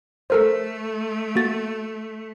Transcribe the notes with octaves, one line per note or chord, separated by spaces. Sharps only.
A3 A4 A#4 C5
A#3 F#4 A6